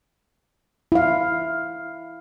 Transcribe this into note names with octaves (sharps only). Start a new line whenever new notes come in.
E4 F5